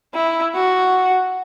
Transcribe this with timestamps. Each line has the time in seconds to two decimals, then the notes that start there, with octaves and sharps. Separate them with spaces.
0.14 E4
0.55 F#4